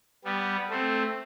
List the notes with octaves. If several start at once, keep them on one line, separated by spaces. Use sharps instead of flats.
G3 B3
A3 C4